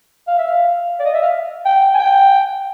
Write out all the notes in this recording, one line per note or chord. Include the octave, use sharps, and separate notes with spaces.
F5
E5
F5
D5
D#5
E5
F5
G5
G#5
G5